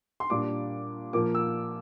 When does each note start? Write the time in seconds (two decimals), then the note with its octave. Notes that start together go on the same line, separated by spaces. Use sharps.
0.20 C6
0.30 A#2 G3 D4 D6
1.13 A#2 F3 A#3 D6
1.35 E6